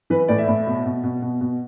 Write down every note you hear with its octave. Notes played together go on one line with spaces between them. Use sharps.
E3 B4
A2 D5
E5
A2
B2
B2
B2
B2
B2